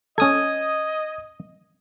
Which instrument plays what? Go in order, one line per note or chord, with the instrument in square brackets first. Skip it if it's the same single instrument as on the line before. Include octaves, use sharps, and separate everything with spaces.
[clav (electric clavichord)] C#4 A4 [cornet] D#5 [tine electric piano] D#6 G#6